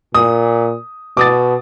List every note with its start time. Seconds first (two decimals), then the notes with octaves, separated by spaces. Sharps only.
0.15 A#2 D#6
1.17 B2 D6 D#6 A6